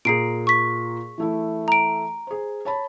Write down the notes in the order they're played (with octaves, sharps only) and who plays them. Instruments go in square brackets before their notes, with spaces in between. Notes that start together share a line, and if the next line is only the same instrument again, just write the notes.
[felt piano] A#2 A#5 [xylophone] G#4 C7 D7
[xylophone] C#6 B6
[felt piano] E3 A3 E4
[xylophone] A#5 D7
[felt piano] G#4 C5
C#5 A5 B5